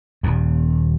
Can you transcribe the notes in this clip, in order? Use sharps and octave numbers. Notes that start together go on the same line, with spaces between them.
D#1 D#2